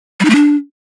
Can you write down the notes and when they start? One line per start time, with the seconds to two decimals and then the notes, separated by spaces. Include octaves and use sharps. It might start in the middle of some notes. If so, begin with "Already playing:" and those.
0.20 G3
0.25 D#4
0.30 A3
0.35 D4